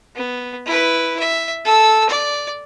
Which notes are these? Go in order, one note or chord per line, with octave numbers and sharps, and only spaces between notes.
B3
E4 B4
E5
A4 E6
D5